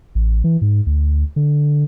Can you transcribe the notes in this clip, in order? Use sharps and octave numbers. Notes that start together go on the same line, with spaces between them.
A1
E3
G#2
D2
D3